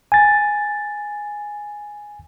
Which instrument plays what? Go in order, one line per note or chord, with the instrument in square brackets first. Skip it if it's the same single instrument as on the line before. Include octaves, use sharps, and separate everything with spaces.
[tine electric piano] G#5 A6